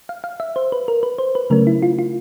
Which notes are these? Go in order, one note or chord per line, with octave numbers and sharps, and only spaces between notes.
F5
F5
E5
C5
B4
A#4
B4
C5
B4
C#3 F#3 A3 C#4 A#4
E4
F4
F4